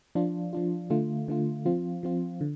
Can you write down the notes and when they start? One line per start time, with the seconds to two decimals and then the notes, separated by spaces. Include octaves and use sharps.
0.15 F3 D4 F4
0.53 F3 D4 F4
0.90 D3 A3 F4
1.28 D3 A3 F4
1.66 F3 C4 F4
2.03 F3 C4 F4
2.41 D3